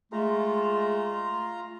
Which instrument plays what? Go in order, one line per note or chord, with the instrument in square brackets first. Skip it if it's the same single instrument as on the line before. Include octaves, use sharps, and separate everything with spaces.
[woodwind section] G#3 A3 [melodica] F4 A#5